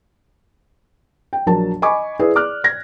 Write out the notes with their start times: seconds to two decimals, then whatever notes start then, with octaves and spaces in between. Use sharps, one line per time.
1.33 G5
1.46 A#1 F#3 A#4 A5
1.82 D#5 G#5 B5 C#6 D6
2.19 E4 G#4 B4 D5
2.35 D5 D6 F6 F#6
2.64 G#6 A#6